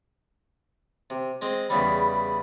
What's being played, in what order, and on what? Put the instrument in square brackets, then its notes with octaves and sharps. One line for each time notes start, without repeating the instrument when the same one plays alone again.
[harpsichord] C3
G#3 C4
[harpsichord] E2 C#3 G3 [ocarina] B5
[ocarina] B5